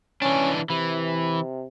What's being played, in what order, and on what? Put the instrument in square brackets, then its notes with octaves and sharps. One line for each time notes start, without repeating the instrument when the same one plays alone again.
[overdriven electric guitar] E3 D4 [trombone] C#4
[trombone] C3 [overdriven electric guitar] E3